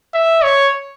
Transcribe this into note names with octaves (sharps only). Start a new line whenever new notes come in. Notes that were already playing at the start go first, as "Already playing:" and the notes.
E5
C#5